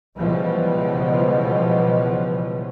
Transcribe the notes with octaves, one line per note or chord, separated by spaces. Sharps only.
C#2 B2 E3 F3 G3